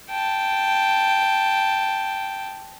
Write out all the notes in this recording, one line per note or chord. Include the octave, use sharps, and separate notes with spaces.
G5 A5